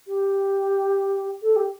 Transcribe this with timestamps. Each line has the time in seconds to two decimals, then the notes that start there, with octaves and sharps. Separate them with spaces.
0.08 G4
1.42 A4
1.56 G4